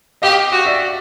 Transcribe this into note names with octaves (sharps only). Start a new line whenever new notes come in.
G4 D#5 F5
F#4
D5 E5